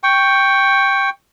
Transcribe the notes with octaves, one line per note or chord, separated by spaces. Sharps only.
G5 C#6